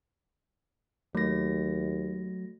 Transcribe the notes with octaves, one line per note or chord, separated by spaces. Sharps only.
D#2 F#3 A3 A#6